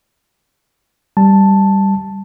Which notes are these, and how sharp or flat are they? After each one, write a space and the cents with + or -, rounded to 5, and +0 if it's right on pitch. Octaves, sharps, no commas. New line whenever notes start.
G3 +0 A5 +0